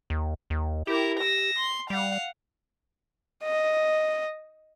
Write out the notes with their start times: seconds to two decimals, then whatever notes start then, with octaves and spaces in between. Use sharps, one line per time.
0.10 D#2
0.50 D#2
0.87 E4 G4 A#4
1.20 E6 A#6
1.59 C6
1.90 G3 F5 F#5
3.44 D#5